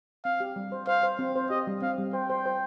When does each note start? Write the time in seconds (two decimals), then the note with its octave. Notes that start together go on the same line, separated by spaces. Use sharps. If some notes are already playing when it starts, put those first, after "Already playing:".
0.25 C4 F5
0.40 G4
0.56 G3
0.72 C5
0.87 C5 F5
1.03 C5
1.19 C4
1.35 C5
1.50 G4 D#5
1.67 G3
1.82 C4 F5
1.98 G3
2.13 C5 G5
2.30 C5
2.46 C5